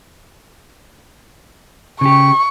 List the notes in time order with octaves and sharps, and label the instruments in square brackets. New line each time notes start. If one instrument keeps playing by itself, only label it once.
[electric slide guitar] C#3 G4 [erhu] C#6